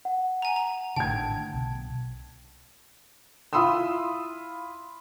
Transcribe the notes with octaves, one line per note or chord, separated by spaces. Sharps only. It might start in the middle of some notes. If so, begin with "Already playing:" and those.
F#5
G#5 A#5
A#5
G#1 A2 D3 G5 A5 G#6
B1
E4 F4 B5 C6 D#6 E6